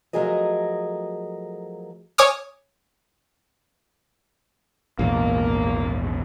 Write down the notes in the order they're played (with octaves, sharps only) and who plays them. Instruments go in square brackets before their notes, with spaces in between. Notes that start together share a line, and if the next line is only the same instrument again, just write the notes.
[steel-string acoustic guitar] F3 F#3 A3 G#4 A#4 D#5
[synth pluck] C#5 G#5 D6 D#6 F6
[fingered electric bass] A#1 E2 G#2 [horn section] A#3